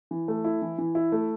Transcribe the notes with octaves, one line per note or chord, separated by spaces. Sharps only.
E3
A3
E4
E3
E3
E4
A3